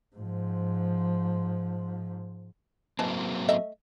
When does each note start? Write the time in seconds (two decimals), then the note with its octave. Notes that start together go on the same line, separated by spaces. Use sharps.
0.16 G#2 F3
2.99 E3 F#3 A#3 C4 D#5 A5
3.49 A3 D#5 E5